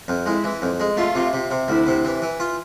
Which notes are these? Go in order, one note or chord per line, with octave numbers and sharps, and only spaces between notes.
F2
G#3 E4
E3
F2
G#3
A3 F4
C3
C3
C3
D2 E4
C3
E3
E3
F4